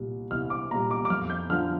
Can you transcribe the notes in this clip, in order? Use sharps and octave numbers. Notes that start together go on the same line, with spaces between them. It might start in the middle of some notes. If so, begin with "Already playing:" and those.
Already playing: C2 A#2 G3
C2 F6
D6
A#2 G3 A#5
D6
D6
F2 F6
G6
D3 F3 F6